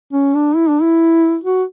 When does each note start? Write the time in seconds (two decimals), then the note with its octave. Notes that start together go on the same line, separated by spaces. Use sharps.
0.13 C#4
0.35 D4
0.56 E4
0.69 D4
0.82 E4
1.44 F#4